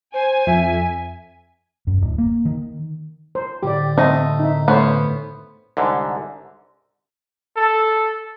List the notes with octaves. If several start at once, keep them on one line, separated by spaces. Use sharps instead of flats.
C5 G#5
F2 E5
F#2
D1
A#3
D#3
C5
A2 D3 G4 D5
A3 C4 D#5
D#4 E5
A3 B3 C#4 C5
C2 G#2 D3
A4